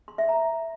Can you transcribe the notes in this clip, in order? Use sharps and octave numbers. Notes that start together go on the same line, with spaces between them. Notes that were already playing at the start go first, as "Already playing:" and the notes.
C6
E5
A#5